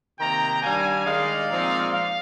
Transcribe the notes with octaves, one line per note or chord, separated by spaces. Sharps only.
C3 D#3 A#3 G5 A#5
D#3 G3 D4 F5 G#5
D#3 G#3 D#4 D5 F5
A#2 F3 G#3 C4 D#4
F5